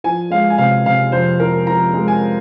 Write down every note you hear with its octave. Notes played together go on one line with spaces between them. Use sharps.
F3 G#5
G#3 F5
G#5
C3 F5
C3 F5
F2 C5
F3 A#4
F3 A#5
G#3
G#5